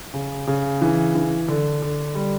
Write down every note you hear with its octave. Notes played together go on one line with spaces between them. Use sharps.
C#3
C#3
E3
E3
D3
D3
G3